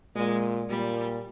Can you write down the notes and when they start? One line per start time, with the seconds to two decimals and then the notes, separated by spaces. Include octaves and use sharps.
0.15 A#2 G#3
0.70 A#2 G3